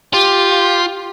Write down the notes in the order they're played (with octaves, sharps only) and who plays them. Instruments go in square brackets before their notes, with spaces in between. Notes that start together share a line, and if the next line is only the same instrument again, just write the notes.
[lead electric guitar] F4 [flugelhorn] G4